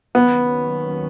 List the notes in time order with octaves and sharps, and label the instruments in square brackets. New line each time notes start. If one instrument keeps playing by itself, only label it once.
[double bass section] D#2 D#3 F#3 C#4 [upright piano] B3